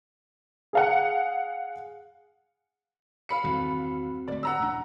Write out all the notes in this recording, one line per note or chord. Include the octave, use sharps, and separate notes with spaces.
G#4 F5 F#5
F5 B5 C#7
E2 G2 D#3 C4 F#4 A4
D1 A3 D5
F#5 A#5 E6
E1 A1 D4